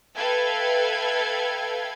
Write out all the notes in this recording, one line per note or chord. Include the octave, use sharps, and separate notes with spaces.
A4 B4 E5 F5 G5 G#6